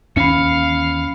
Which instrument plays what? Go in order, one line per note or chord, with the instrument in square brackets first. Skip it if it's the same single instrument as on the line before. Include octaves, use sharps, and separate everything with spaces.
[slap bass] D#2 E3 C#4 [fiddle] F5 [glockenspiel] B5 C#7